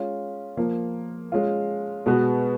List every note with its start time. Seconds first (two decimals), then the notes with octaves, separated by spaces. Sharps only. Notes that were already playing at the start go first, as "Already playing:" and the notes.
Already playing: G#3 C#4 F4
0.57 F3 A#3 F4
1.32 G#3 C#4 F4
2.06 B2 G#3 B3 F#4